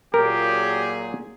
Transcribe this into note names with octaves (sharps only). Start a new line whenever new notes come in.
A#2 F#3 G4 G#4 A#4